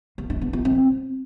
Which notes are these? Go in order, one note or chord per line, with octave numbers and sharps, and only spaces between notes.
A#3
D4
B3
F4
C4